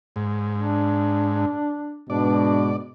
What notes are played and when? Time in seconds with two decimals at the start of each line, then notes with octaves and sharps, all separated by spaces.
0.16 G#2
0.58 D4
2.10 G#2 B2 D4 D5